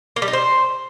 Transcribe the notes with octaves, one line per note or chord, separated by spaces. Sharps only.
A#3
G3
D#4
C5